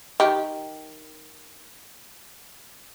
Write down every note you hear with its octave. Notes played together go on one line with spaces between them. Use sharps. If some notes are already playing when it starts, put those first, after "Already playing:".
D#3 G4